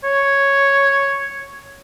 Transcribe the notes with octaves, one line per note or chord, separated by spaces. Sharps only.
C#5